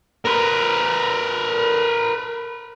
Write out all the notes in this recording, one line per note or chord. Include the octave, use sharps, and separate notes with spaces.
A#4 B4